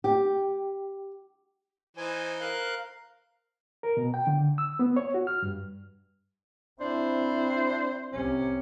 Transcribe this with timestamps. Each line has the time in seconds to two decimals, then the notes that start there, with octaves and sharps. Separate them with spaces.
0.04 G4
1.97 E3 D#4 C5 G#5
2.41 A#4 F5 F#6
3.83 A#4
3.97 B2
4.14 G5
4.27 D3
4.58 E6
4.79 B3
4.97 C#5
5.14 F#4
5.27 F6
5.42 G2
6.81 C4 D4 E4 C5
8.13 C2 C3 C#4